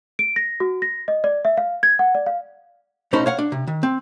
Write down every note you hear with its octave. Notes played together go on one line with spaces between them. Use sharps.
D7
A#6
F#4
A#6
D#5
D5
E5
F5
G#6
F#5
D5
F5
B1 A2 C#4 D#4 C5 B5
C#5 F5 F#5
D4
C3
D#3
C4